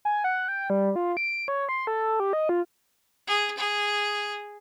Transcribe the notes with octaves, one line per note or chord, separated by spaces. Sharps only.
G#5
F#5
G5
G3
F4
D7
C#5
C6
A4
G4
D#5
F4
G#4
G#4